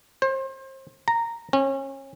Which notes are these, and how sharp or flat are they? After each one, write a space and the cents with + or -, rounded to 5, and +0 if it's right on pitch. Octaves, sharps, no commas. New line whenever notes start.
C5 +30
A#5 -10
C#4 -30